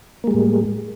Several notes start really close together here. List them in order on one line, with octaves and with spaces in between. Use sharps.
A#3 G#3 G3 A2